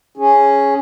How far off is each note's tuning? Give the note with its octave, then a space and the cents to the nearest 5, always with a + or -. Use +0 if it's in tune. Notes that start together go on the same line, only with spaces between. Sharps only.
C#4 +0 G#4 +0